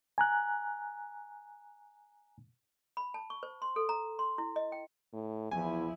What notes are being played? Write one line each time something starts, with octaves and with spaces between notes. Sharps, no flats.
G#5 A#5 F#6
B5
A5
C#6
C5
C6
A4
A#5
C6
E4
D#5
G5
A2
E2 F3 E4 G#5